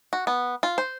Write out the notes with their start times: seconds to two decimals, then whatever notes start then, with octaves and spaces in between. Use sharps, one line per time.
0.13 F#4
0.27 B3
0.63 F4
0.78 C5